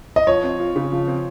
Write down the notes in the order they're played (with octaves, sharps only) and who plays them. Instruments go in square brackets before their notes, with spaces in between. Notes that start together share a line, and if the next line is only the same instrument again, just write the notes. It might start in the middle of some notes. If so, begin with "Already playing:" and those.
[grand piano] D#5
[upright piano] F3 [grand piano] C#5
[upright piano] C4
F4
C#3
F3
C4